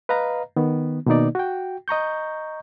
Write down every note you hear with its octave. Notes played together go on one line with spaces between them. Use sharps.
B4 D#5 F5 A#5
D#3 B3
B2 D#3 A#3 D#4 D5
F#4 G5
D#5 A#5 C#6 G6